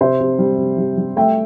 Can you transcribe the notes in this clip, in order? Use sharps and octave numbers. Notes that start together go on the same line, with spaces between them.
C3 C5 E5
C3
G3
C3
G3
G3
A3 E5 G5